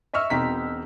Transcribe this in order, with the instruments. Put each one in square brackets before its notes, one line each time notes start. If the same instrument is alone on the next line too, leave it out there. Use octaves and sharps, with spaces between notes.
[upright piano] D#5 E5 C#6 E6 F6
E1 B2 C4 D#4 A#5 B6